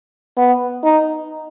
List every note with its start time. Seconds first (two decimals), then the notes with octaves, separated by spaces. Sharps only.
0.37 B3
0.84 D#4